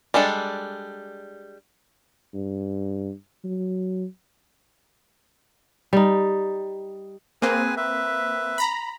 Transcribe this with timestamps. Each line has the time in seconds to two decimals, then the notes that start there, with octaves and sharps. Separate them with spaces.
0.14 G3 G#3 D4 A4
2.34 G2
3.44 F#3
5.93 G3 D#4
7.42 A#3 C4 G#4 B4 G#5
7.77 B4 E5
8.58 A#5 B5